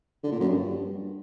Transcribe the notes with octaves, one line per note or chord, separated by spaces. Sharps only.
D3
A#2
F#2
G2